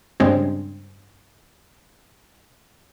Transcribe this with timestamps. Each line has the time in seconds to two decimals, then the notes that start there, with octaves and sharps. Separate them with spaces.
0.20 G2 C#3 G#3 C4